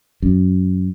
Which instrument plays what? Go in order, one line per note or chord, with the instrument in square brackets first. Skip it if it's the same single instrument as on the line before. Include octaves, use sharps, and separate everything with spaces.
[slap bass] F#2